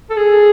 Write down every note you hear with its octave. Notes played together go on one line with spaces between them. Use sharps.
A4
G#4